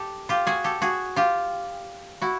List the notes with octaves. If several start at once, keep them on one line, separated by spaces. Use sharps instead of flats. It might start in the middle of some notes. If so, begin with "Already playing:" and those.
Already playing: G4 A4
F4 G4
F#4 G#4
G4 A4
F#4 G#4
F4 G4
E4 F#4